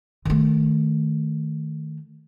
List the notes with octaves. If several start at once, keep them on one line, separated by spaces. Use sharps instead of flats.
D#3 A3